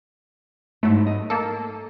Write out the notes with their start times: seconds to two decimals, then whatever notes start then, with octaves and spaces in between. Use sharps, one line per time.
0.83 G#2 F#3 A3 E4
1.07 D#5
1.30 A#3 A4